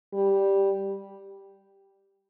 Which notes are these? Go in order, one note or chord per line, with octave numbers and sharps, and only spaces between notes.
G3